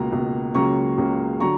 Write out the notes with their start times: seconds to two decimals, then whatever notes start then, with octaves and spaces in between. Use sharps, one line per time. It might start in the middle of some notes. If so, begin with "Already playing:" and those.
Already playing: C#2 B2 A#3 A#5
0.12 C#2 B2 A#3
0.55 C#2 C#3 F#3 A#3 A#5 C#6
0.98 C#2 C#3 F#3 A#3
1.40 D3 F#3 A#5 C#6